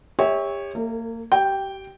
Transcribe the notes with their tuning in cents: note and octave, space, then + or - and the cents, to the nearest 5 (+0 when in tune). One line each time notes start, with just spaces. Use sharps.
G4 +35 C#5 +0 E5 -25
A#3 -30 A4 +40
G4 -30 G5 +0